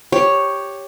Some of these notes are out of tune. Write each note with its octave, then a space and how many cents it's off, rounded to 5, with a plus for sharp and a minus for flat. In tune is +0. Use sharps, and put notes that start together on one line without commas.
G4 +5 C#5 +0